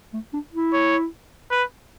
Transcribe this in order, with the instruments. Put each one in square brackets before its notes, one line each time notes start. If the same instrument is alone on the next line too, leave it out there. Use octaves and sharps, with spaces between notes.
[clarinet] A3
D4
E4
[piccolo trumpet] C#5
B4